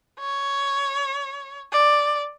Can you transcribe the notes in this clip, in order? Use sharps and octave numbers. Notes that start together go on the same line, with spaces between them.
C#5
D5